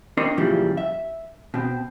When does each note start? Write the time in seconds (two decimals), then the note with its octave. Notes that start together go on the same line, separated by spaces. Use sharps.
0.17 C4 D4 A#4 C#5 D#5 C6
0.37 F#2 A#2 C#3 E3 F3 G3
0.77 E5
1.54 B2 C4